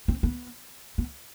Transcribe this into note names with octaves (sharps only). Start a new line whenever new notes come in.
C4
B3
B3